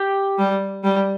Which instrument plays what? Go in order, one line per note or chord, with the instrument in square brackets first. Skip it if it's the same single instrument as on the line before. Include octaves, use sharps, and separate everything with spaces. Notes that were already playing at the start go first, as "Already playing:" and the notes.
Already playing: [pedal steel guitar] G4 G5
[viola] G3
G3